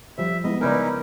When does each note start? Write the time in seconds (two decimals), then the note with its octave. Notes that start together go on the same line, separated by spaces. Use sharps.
0.18 F3 G3 C5 E5
0.44 G#3 B3 E4 D#5
0.61 C#3 B3 C#4 D#4 E4 A#4 B4 D5